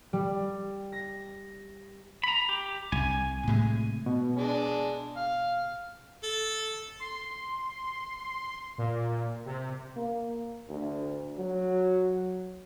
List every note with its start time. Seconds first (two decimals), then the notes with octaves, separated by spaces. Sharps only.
0.13 G3
0.92 A#6
2.24 A#5 B5
2.49 G4
2.92 C2 G#5
3.47 A2 C3 G#3
4.06 B2
4.37 G#3 D4
5.16 F5
6.23 A4
7.00 C6
8.78 A#2
9.46 C3
9.96 A#3
10.69 D2
11.39 F#3